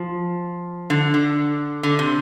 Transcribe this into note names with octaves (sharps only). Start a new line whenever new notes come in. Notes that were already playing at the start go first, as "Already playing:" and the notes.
Already playing: F3
D3
D3
D3
C3